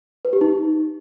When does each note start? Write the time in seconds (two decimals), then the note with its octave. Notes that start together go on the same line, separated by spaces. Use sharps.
0.25 B4
0.33 G4
0.41 D#4